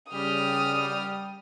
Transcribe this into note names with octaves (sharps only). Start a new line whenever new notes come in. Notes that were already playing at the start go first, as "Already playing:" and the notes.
C#3 G3 G4 D#6 F6